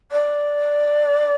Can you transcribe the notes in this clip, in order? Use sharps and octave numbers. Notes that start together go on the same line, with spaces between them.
D5